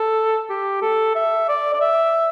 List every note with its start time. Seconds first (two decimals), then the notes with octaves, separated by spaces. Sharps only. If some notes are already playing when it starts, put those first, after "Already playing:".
Already playing: A4
0.50 G4
0.82 A4
1.16 E5
1.49 D5
1.74 D5
1.81 E5